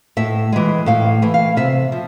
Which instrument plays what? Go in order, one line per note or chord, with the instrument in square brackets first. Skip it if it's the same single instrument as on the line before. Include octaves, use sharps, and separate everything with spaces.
[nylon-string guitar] A2 E5
E3 G#3
A2 F5
E3 A3
F5
C3 E5
F3